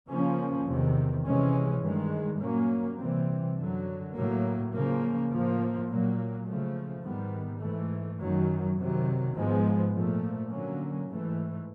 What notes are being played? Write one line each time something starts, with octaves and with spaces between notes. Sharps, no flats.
C#3 F3 A#3 C#4
E2 C3 D#3
C3 E3 G#3 C#4
G2 D#3 G#3
A#2 F#3 A#3 C#4
C3 E3 G3 C4
F#2 D3 F#3
A2 F#3 A#3
C#3 F3 A#3
A2 F3 A#3
A#2 F#3 A#3
C#3 F3 A3
G#2 D#3 G3 B3
G#2 E3 A3
F#2 D#3 F#3
C3 D#3 F#3
G#2 F3 G#3 B3
A#2 F3 A3
D3 F#3 A#3 C#4
G#2 E3 A3